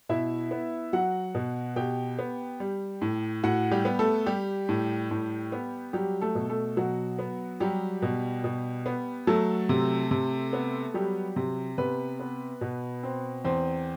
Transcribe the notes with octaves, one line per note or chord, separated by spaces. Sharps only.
B2 E4 E5
B3
F#3 F#4 F#5
B2
B2 G4 G5
B3
G3
A2
A2 F#4 F#5
G3 G4
B3
A3 A4
G3 G4
A2
A2
B3
F#3 G3 G4
A3 A4
B2
A3 A4
B2 F#3 F#4
B3
F#3 G3 G4
B2
B2
B3
F#3 A3 A4
C3
C3
B3
F#3 G3 G4
C3
C3 B3 B4
B3
B2
C4
E2 C4 C5